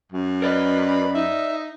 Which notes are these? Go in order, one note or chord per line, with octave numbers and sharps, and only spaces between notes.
F#2
A#4 B4 D5 D#5
B5
D#4 E5